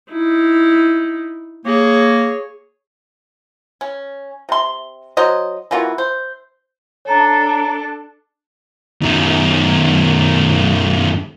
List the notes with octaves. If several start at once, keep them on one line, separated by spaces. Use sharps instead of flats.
D#4 E4
A#3 G#4 C#5
C#4
C3 C6
F#3 C5 D#5
E3 A#3 F4 F#4
C5
D4 A4 C#5 A#5
F#2 D#3